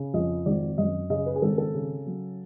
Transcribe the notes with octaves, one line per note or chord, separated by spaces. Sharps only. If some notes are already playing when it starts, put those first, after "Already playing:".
Already playing: C#3
F2 D#5
G#1 D5
F#2 D#5
C#3 D#5
B4
G#4
G#1 A4
A4
C#3
F#3